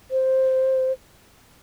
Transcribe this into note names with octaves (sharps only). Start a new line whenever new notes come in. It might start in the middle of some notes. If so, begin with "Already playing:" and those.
C5